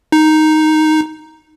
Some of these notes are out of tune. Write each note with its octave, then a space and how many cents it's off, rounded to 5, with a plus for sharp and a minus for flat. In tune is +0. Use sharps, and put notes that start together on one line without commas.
D#4 +0